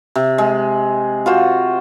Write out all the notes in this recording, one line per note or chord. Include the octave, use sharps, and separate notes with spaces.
C3
G#3
F4 F#4 C5